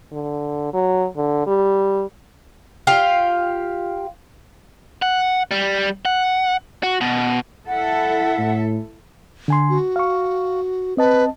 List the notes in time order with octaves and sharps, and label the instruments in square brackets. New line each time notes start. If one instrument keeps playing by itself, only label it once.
[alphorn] D3
F#3
D3
G3
[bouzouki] F4 G4 F5
[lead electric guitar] F#5
G3
F#5
F#4
B2
[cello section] E4 A4 E5 [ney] F#5
[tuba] A2
[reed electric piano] D3 G#5 C6
[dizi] F#4
[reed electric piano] F5 C#6
[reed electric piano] C4 D#5 A5 [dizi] B4